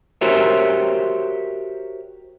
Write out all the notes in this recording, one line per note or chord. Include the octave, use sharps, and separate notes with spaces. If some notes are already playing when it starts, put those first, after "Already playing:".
F#4 G4 A#4 C5 C#5 E5